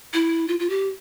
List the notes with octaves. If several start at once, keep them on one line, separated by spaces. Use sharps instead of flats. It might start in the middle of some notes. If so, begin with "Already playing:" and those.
E4
F4
F4
G4